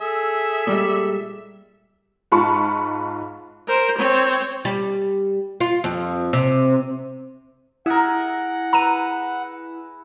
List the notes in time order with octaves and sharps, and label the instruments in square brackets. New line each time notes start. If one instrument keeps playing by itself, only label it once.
[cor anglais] G#4 [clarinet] A4 [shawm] E5
[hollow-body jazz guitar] A#2 G3 G#3 [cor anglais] D5
[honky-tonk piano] G#2 F4 A5 B5 C#6
[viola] A#4 C5
C4 C#5
[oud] G3
F4
F2
C3
[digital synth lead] E4 [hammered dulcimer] G#4 A#4 [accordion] F#5
[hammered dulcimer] B4 E5 [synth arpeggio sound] A#5 D#7